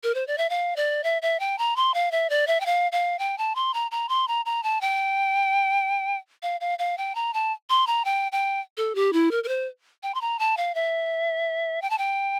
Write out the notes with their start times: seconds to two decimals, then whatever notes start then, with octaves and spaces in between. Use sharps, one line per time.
0.03 A#4
0.15 C5
0.27 D5
0.38 E5
0.50 F5
0.76 D5
1.04 E5
1.22 E5
1.40 G5
1.58 A#5
1.76 C6
1.94 F5
2.12 E5
2.30 D5
2.47 E5
2.61 G5
2.66 F5
2.92 F5
3.19 G5
3.38 A5
3.55 C6
3.74 A#5
3.91 A#5
4.09 C6
4.28 A#5
4.46 A#5
4.63 A5
4.81 G5
6.43 F5
6.61 F5
6.79 F5
6.98 G5
7.15 A#5
7.34 A5
7.70 C6
7.87 A#5
8.05 G5
8.32 G5
8.77 A4
8.95 G4
9.13 E4
9.31 A#4
9.44 A#4
9.48 C5
10.03 G5
10.15 C6
10.21 A#5
10.39 A5
10.57 F5
10.75 E5
11.82 G5
11.90 A5
11.98 G5